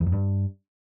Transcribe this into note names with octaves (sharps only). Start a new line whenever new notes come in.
E2
F2
G2